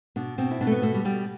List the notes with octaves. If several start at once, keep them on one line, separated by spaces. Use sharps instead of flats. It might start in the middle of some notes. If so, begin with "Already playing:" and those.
B2 D4
B2 C4
E4
B2 D4
A3
B3
B2 A3
G3
B2 G3